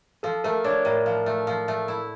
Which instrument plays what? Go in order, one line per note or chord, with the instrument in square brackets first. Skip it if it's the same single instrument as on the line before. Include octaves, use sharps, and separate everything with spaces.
[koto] F3 [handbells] A4
[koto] A3 [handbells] A#4
[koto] D4 [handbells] C#5
[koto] A2 [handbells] A#4
[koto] F3
A3
F3
A3
E4